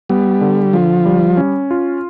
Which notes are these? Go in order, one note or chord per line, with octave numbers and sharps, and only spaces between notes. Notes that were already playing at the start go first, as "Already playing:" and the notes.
G3 B3
D3
D3 F3
G3
C#4
F4